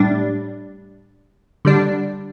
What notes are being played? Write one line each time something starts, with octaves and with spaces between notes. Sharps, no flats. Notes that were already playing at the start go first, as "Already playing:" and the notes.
Already playing: A2 G3 D4
D3 G3 D4